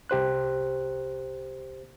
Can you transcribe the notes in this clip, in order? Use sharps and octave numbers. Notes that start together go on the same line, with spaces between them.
C2 G4 C5 F#6